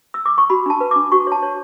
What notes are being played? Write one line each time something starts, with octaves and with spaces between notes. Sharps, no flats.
E6
D6
C#6
F#4 B5
D4 A5
B4
D4 D6
F#4 C#6
C#5 A5
C#5